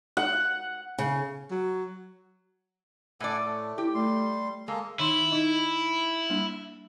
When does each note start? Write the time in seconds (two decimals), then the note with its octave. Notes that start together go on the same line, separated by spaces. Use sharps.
0.17 F#5
0.98 C#3
1.51 F#3
3.20 A2 A4 D5 F#5 G#5
3.44 A3
3.78 E4 G4
3.94 G3 A3 C6
4.68 G#3 A#3 A4
4.99 D#3 D#4 E4 C6
5.32 D#4 D#5
6.30 G3 A#3 D4